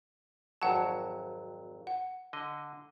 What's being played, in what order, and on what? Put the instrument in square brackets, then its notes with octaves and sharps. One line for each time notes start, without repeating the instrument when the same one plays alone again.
[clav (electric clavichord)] G#1 F2 F#3 [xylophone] F#5 A5
[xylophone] F#5
[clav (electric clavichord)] D3 D#5